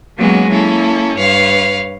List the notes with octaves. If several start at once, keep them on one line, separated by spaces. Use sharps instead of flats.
F#3 G#3 A#3 B3 C#4 F#4
A#3 C#4 E4 A4
G2 B4 C#5 F5